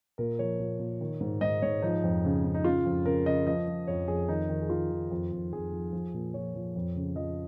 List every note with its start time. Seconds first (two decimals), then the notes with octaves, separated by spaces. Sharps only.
0.18 A#2 A#4
0.39 F3 C#5
0.60 A#2
0.80 A#2
1.01 D#3
1.21 G#2
1.41 G#2 D#5
1.62 G#2 C#5
1.82 F3 D#4
2.04 F2
2.24 C#3
2.45 C#3
2.54 D#4
2.64 C#3 F4
2.86 F2
3.05 C#3 A#4
3.26 C#3 D#5
3.47 F3 D#5
3.68 F3
3.87 F2 C#5
4.08 F2 G#4
4.28 D#3 D#4
4.49 D#3
4.61 G#4
4.70 D#3 F4
4.91 D#3
5.11 F2
5.32 F2
5.53 F2 G#4
5.73 F3
5.93 F3
6.14 A#2
6.34 F3 C#5
6.55 F3
6.76 F2
6.96 C#3
7.16 F3 D#5